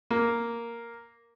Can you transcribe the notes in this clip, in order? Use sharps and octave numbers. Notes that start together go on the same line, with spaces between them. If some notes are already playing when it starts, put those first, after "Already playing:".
A#3